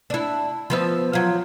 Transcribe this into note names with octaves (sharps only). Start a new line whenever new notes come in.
D4 E4
F3 B3 E5
F3 F#3